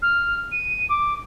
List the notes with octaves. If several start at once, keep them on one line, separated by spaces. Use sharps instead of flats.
F6
D#7
D6